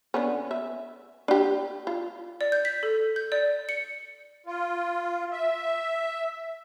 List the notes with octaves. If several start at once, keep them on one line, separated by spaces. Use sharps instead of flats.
D3 B3 C#4
E5
D4 G4
F4
D5
G6
B6
A4
G6
D5
C#7
F4
E5